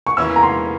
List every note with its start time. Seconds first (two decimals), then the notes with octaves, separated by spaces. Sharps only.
0.07 C#6
0.17 E2 E3 A#3 C#4 E4 E6
0.36 A#5
0.43 C6